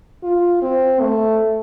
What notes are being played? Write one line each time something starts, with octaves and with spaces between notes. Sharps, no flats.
F4
C4
A3